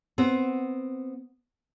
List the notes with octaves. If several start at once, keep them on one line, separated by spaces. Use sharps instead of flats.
B3 C4